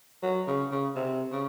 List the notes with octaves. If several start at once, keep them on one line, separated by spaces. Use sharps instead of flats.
F#3
C#3
C#3
C3
C#3